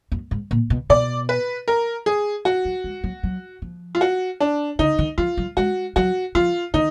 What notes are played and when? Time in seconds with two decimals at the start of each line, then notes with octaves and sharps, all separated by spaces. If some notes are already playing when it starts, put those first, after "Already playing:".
0.12 F#2
0.31 G#2
0.51 A#2
0.70 B2
0.90 B2 D5
1.29 B4
1.68 A#4
2.06 G#4
2.45 F#4
2.65 F#3
2.84 G#3
3.04 F#3
3.23 F#3
3.62 F3
3.95 F4
4.01 F#4
4.40 D4
4.79 D3 D#4
4.99 D#3
5.18 F3 F4
5.37 F#3
5.57 G#3 F#4
5.96 F#3 F#4
6.35 F3 F4
6.74 D#3 D#4